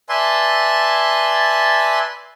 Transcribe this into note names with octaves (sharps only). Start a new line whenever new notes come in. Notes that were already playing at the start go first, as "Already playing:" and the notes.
B4 D5 E5 G#5 A5 C6